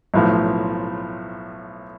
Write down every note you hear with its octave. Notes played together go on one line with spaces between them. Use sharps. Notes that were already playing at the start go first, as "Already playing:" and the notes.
B1 A2 F3